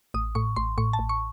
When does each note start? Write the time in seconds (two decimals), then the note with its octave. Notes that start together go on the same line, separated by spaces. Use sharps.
0.14 A1 D#6
0.35 A2 C#6
0.56 A1 C6
0.78 A2 C#6
0.93 A5
0.99 A1
1.09 C#6